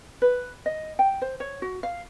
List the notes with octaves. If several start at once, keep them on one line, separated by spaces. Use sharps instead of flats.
B4
D#5
G5
C5
C#5
F#4
F5